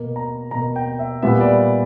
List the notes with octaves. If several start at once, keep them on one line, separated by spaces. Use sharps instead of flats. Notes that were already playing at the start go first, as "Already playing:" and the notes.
Already playing: B2 A#3
A#5
B2 A#3 A#5
G5
E5
A#2 G3 B3 E5
D5